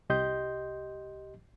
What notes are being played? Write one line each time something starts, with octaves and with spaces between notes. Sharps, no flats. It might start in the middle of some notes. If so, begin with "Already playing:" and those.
C2 G4 D#5 C6 G6